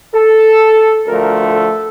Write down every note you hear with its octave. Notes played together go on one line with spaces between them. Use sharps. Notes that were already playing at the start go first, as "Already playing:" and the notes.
A4
D2 D3 F3 A3 A#4
A4